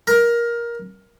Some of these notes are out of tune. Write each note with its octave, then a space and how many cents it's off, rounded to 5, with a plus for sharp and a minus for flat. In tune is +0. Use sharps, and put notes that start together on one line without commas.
A#4 +15